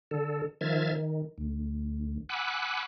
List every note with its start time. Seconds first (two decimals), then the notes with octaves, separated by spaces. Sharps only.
0.11 D3 A4
0.61 D#3 F3 E5 F6 G#6 A6
0.93 D#3
1.38 D2
2.29 F#5 G#5 B5 D6 E6 F#6